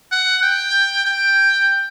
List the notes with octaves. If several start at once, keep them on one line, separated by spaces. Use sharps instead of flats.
F#5
G5
G5